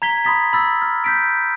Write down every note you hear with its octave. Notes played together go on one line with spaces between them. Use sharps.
A#5 G#6 B6 G7
B5 C6 D#6 A6 B6
B5 E6 A6
F6
G6 B6 D7